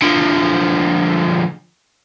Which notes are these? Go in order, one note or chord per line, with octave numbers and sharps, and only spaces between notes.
D3 F3